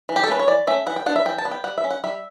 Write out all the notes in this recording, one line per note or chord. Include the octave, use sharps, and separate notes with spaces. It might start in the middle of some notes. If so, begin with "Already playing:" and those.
E3
G4
A4
A3 C#4 B4
C#5
E3 D5
A3 C#4 E5
E3 F#5
G5
B3 D4 F#5
E5
E3 G5
A5
B3 D4
G5
G3 F#5
E5
C#4
F#5
G3 E5